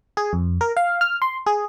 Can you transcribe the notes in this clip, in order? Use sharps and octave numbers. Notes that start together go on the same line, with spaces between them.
G#4
F2
A#4
F5
F6
C6
G#4